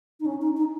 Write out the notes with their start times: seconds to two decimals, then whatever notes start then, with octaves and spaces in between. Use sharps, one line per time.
0.20 D#4
0.26 C#4
0.41 D#4
0.56 D#4